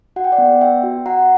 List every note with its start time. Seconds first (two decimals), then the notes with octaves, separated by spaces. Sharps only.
0.16 F#4 F#5
0.24 G5
0.32 D5 F#5
0.38 B3
0.61 B3 E5 G5
0.83 F#4
1.06 F#4 F#5 A#5